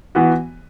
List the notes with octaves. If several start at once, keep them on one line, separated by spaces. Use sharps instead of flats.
E3 B3 F#4